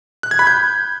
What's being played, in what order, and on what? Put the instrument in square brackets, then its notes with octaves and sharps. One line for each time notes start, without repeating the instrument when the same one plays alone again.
[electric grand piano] F#6
G#6
B5
G6